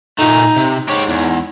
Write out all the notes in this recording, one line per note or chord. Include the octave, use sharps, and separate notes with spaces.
A#2 A3 D#4
C3
G#2 G4 C#5
E2